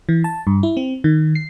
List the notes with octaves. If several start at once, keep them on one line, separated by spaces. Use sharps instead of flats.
E3
A5
G2
E4
C4
D#3
C7